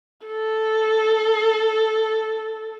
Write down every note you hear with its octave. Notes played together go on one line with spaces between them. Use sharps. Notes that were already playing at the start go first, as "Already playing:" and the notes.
A4